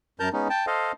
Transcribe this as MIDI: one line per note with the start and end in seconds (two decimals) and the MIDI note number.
0.20 0.29 42
0.20 0.29 70
0.20 0.29 81
0.20 0.29 82
0.20 0.29 91
0.33 0.48 56
0.33 0.48 59
0.33 0.48 61
0.33 0.48 63
0.50 0.66 79
0.50 0.66 81
0.67 0.92 69
0.67 0.92 72
0.67 0.92 75
0.67 0.92 77